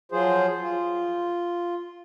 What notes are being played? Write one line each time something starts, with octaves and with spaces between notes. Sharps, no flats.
F3 F#3 F4 G#4 C5
F4